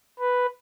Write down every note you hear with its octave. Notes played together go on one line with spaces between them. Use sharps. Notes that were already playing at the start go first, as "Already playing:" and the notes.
B4